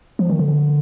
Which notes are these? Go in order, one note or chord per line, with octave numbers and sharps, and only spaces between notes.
F3
D#3
D3